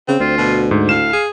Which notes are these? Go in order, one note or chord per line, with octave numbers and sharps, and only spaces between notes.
C#3 C4
D2 F4
B2
G#2
A2 F5 E7
G#4